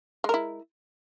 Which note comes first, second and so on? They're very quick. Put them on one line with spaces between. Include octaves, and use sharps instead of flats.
G#3 A#4 E4